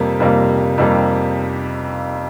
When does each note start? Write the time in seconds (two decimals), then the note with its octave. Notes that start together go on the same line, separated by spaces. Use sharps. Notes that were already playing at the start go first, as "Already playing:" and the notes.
Already playing: F2 C3 G3 A#3
0.20 F2 C3 G3 A#3
0.78 F2 C3 G3 A#3